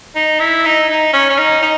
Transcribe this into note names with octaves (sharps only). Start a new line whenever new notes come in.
D#4
E4
D#4
D#4
C#4
C#4
D#4
D#4